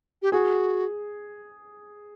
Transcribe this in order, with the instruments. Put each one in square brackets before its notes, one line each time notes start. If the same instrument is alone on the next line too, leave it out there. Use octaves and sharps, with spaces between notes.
[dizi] G4
[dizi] F#4 [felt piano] G#4